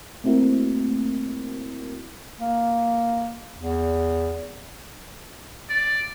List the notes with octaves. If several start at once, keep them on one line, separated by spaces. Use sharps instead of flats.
A3 A#3 C4 E4 F#4 A#4
A#3
E2
D5